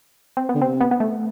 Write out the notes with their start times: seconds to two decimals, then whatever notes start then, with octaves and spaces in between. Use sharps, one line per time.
0.37 C4
0.49 B3
0.55 D3
0.61 C3 C4
0.81 B3
0.91 B3
1.00 A3